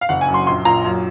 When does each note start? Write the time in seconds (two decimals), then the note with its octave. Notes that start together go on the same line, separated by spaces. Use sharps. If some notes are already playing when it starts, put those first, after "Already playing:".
0.01 F5
0.09 F#1 F#5
0.21 G#5
0.28 F#2
0.34 C6
0.47 A#1 C6
0.65 A#2 A#5
0.85 F#2